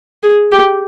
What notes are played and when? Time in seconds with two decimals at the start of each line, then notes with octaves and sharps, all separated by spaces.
0.23 G#4
0.52 G4